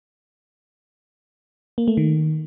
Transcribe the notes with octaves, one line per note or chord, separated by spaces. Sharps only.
A#3
A3
D#3